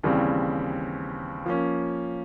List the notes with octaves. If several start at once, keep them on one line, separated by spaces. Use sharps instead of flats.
D#2 C#3 E3 G3 C4
F3 A#3 C#4